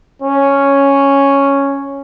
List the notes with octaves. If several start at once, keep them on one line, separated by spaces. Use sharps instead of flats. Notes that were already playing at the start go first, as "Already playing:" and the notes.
C#4